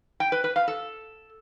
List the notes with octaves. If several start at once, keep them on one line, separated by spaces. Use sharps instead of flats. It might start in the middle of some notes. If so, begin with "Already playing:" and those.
G5
B4
B4
F5
A4